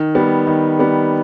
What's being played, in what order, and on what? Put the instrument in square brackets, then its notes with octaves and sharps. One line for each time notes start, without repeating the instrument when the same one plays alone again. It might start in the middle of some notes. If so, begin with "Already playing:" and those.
Already playing: [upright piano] D#3
G3 B3
D#3
G3 B3